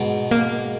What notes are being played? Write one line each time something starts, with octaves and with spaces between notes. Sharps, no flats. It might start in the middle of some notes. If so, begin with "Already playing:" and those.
Already playing: G#2 B2
A#3